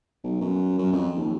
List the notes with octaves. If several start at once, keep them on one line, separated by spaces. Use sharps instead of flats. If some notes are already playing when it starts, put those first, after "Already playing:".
B1
F#2
F#2
F2
D#2